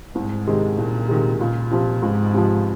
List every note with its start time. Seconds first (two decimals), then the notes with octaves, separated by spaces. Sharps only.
0.15 C2 G#2
0.47 C3 D#3 G#3
0.78 C2 A#2
1.09 C3 D#3 G#3
1.40 C#2 A#2
1.71 C3 F3
2.02 C#2 G#2
2.34 C3 F3